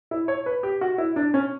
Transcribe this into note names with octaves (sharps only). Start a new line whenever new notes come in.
E4
C#5
B4
G4
F#4
E4
D4
C#4